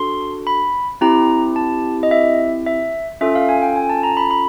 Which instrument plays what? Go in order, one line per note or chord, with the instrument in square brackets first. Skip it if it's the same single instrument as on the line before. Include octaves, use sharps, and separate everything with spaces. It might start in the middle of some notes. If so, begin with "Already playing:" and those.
Already playing: [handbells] D4 F#4 A4 C6
B5
C4 E4 G4 A#5
A5
D#5
E5
E5
C#4 F4 A4 E5
F5
G#5
G5
G#5
A5
A#5
B5
B5